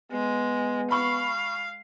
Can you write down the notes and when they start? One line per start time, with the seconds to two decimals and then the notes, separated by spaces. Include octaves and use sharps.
0.12 G#3 B3
0.91 F5 B5 C#6